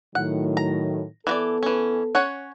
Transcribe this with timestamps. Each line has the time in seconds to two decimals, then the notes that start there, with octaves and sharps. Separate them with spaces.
0.15 A2 D#3 F#3 F#5
0.57 A#5
1.27 E3 B3 F#4 A4 D5
1.63 E3 C#4
2.15 C#4 C#5 F#5